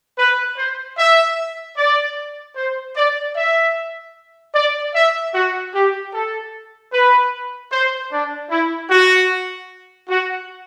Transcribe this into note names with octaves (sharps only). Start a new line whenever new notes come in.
B4
C5
E5
D5
C5
D5
E5
D5
E5
F#4
G4
A4
B4
C5
D4
E4
F#4
F#4